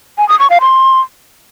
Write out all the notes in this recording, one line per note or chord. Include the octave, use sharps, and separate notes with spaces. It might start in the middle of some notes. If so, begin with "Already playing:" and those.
G#5
D#6
C#6
F5
C6